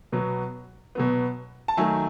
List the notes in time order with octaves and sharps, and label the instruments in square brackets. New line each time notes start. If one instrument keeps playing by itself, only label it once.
[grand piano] B2 F#3 B3
B2 F#3 B3
A5
D#3 F#3 A3 E5 G#5